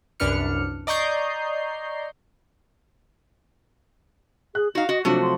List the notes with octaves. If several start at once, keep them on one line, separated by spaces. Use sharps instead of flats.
C2 F#2 D4 B4 F6 C#7
D5 D#5 A#5 C#6 G6 C7
G#4 F#6
D#4 F#4 F5
F#4 D#5
C3 F3 F#3 A3 D4 F#4
C6